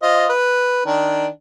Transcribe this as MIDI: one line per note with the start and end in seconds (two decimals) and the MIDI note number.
0.03 0.27 65
0.03 0.27 72
0.03 0.27 75
0.29 0.84 71
0.86 1.27 51
0.86 1.27 62